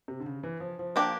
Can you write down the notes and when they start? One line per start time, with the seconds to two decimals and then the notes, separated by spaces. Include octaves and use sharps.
0.08 C3
0.20 D3
0.26 C#3
0.43 E3
0.60 F3
0.79 F3
0.96 A#3 D4 G4